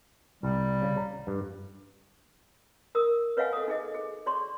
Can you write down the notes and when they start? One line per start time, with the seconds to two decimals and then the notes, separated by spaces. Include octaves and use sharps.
0.43 C2 G3
0.82 C#3
0.97 A#5
1.27 G2
2.95 A#4 D#6 E6
3.37 B4 C#5 D#5 F5 F#5 G#5
3.53 A4 D#6
3.68 D#4 G#4 D#5
3.94 G#4
4.26 G#4 C#5 D5 C6 C#6